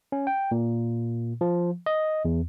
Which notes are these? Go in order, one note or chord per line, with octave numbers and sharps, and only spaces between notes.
C#4
G5
A#2
F3
D#5
E2